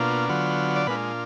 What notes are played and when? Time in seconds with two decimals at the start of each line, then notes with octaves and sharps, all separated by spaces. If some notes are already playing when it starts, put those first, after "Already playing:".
Already playing: B2 A#3 D4 F4
0.29 D3 F#3 B3 F4
0.76 D5
0.87 A#2 G#3 B3 D4 F4 B4